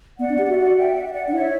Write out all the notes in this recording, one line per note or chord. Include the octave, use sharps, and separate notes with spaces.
B3 D5 F#5
D4
G4
F#4 E5
D5 F#5
E5 G5
F#5
E5
D5 F#5
D4 F#5
E4 C#5 E5